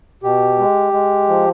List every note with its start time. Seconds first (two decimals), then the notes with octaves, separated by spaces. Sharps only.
0.23 B2 G4
0.59 G#3
0.93 G#3
1.29 F3